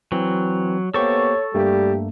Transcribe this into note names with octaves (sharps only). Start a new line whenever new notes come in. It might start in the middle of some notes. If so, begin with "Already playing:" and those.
E3 F#3 C4
A#3 B3 G4 A4 C5 C#5 C#6
G2 G3 A3 A#3 G4